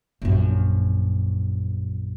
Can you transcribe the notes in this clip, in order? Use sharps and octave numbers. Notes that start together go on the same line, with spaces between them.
A#1 F#2